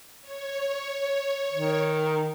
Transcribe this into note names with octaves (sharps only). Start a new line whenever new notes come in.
C#5
D#3